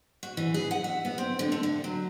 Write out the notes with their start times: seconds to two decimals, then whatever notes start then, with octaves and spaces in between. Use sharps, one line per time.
0.23 F#4
0.37 E3
0.54 G#4
0.71 F#5
0.84 E5
1.05 B3
1.18 C4
1.39 D3
1.52 A3
1.63 D3
1.84 F#3